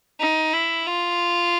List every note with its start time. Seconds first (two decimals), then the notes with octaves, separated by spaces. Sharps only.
0.20 D#4
0.53 E4
0.87 F4